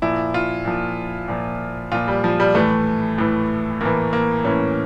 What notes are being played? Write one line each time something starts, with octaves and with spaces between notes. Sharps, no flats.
A#2 F3 E4
F4
A#2 F3
A#2 F3
A#2 F3 F4
G3
F3
G3
A2 E3 A3
A2 E3
A2 E3 A#3
A#3
A2 E3 C#4